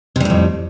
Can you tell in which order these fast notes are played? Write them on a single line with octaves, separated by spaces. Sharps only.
C3 G3 A2 F2